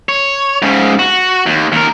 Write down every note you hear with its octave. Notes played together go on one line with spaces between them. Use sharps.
C#5
G#2 C#3
F#4
D#2
D#2 A#4